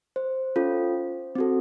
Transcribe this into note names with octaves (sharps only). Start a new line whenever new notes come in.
C5
C#4 F4 A4
C4 F#4 A4